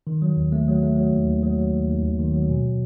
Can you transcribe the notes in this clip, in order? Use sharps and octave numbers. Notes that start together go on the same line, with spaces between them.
D#3
F#3
D#2
A3
F#3
A3
F#3
D#2
D#2
F#3
F#3
D#2
D#2
D#2
D#3
F#3
B2